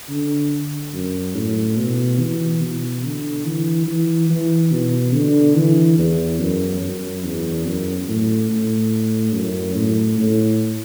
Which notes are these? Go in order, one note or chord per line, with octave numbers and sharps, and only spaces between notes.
D3
F#2
A2
B2
E3
B2
D3
E3
E3
E3
B2
D3
E3
E2
F#2
F#2
E2
F#2
A2
A2
F#2
A2
A2